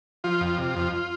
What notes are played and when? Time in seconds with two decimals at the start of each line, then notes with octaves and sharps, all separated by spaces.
0.24 F3 F4
0.41 F2
0.58 C3
0.76 F2